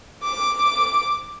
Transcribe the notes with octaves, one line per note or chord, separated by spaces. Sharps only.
D6